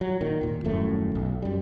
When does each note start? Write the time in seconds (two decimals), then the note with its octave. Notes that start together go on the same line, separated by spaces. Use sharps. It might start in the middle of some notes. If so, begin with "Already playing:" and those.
0.01 F#3
0.21 A#2 D#3
0.41 D#2 A#2
0.64 D#1 F#2 A2 A3
1.15 B1
1.42 F#2 G3